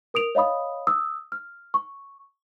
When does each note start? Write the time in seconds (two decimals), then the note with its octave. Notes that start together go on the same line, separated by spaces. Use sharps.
0.14 A#4 D#6 D7 F7
0.35 C#5 D#5 F5 B5 D#6
0.87 D#6 E6
1.32 F6
1.74 C#6